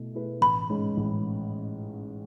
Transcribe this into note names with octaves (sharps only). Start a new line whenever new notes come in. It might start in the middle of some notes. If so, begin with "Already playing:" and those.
Already playing: B2 A3 E4
A3 E4 G#4 B4
A1 B5
G#2 G#3 C#4
A1